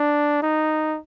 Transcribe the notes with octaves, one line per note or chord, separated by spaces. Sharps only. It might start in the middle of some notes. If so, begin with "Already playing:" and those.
Already playing: D4
D#4